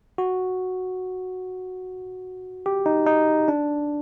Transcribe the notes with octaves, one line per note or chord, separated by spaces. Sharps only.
F#4
G4
D#4
D#4
D4